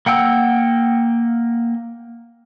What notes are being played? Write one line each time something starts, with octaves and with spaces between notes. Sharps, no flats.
A#3 F#5 G5 E6